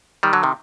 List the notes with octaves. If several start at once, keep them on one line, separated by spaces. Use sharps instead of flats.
D#3 G3
D3 F#3
C3 D#3